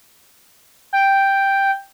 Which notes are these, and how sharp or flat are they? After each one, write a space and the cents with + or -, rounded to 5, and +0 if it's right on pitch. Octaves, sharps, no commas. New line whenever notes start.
G5 +0